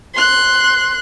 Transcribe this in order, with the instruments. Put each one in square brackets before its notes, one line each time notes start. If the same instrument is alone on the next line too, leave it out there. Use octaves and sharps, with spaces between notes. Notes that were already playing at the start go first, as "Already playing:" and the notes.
[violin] C6 F#6